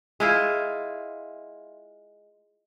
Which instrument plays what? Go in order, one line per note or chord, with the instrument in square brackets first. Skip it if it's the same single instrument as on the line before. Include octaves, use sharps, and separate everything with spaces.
[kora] G#3 E4 F4